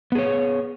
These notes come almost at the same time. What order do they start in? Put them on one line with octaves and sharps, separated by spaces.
B3 G#4 C#5